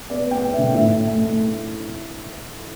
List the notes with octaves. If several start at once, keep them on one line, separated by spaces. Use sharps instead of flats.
B3 D5
B3
G5
B3
D3 E5
A2 E5
A3
A3
A3